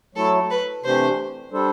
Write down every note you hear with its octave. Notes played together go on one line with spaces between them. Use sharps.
F#3 A3 E4 A4
B4
C3 E3 A3 D4 G4 C5
G3 D4 A4 C5